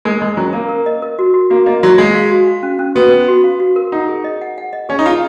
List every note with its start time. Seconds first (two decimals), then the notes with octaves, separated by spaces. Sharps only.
0.05 G#3 A#4
0.21 G#3 D#5
0.37 F#3 C#4
0.53 A#3 A#4
0.69 A#4
0.86 D#5
1.02 A#4
1.19 F#4
1.34 F#4
1.50 A#3 F#4
1.66 A#3 D#5
1.83 F#3 F#4
1.98 G#3 F5
2.15 F5
2.31 F#4
2.47 F5
2.63 C#4
2.79 C#4
2.95 B3 F#4
3.12 C#4
3.28 F#4
3.44 F5
3.60 F#4
3.76 A#4
3.92 D#4 F#5
4.08 G#4
4.24 D#5
4.42 F#5
4.58 F#5
4.73 D#5
4.89 C#4 G#4
4.99 D#4
5.06 F4 G#4